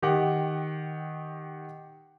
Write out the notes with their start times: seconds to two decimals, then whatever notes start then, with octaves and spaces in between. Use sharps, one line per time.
0.02 D#3 G4 F#5